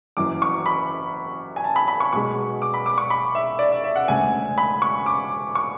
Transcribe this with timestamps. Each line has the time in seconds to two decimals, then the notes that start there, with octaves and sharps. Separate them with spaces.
0.17 F#1 F#2 E3 D6
0.42 C#6
0.66 B5
1.56 G#5
1.64 A5
1.76 B5
1.88 B5
2.00 C#6
2.13 B1 B2 G#3 B3 C#6
2.62 D6
2.74 B5
2.86 D6
2.98 C#6
3.10 B5
3.35 E5
3.59 D5
3.72 E5
3.84 E5
3.96 F#5
4.08 E1 D2 C#3 G#5
4.58 B5
4.82 C#6
5.06 D6
5.55 C#6